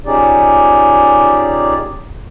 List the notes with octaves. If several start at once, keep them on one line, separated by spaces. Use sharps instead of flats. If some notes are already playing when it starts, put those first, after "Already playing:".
A#2 C#4 D#4 G4 G#4 D5